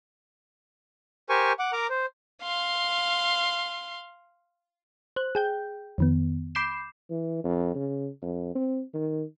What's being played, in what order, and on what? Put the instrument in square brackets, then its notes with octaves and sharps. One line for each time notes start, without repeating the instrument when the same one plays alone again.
[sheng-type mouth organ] G4 A#4 C5 G#5 C#6
F#5 D6
A#4 A#5 D6
C5
[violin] F5 C6
[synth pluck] C5 F#6
G#4 G5 G6
F2 D#3 B3
B5 D6 G6 C7 E7
[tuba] E3
F2
C#3
F2
C4
D#3